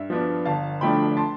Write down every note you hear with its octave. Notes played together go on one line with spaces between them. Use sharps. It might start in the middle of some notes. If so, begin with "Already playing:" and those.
Already playing: G2 E5
F3 B3 D4
G1 F5 A5
G2 F3 A3 D4 G5 B5
A5 C6